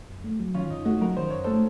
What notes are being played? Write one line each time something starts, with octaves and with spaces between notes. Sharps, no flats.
F#2
A3
F#3
D#3 C#4 F4
F#2 D#4
A3 D#4 F#4
F#3 F#4 A#4
D#3 C5
F#2 C#5
A3 A4 C5